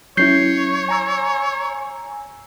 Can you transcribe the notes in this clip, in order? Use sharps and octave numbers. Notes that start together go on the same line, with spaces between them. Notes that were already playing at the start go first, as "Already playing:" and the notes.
F#3 C#4 E4 C#5 G6 C7
G#5 A#5 E6